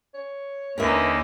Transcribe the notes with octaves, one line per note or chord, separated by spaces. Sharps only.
C#5
D#2 D3 C#4 D#4 A#4 B4 E5